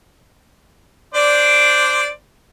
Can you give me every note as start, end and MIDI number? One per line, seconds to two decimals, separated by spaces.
1.14 2.09 62
1.14 2.09 72
1.14 2.09 74